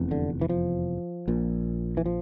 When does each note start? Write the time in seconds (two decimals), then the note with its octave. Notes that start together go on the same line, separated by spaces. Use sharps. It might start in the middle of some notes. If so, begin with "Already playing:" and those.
Already playing: F1 E2 C3
0.11 D3
0.41 E3
0.49 F3
1.28 A#1 A#2
1.97 E3
2.06 F3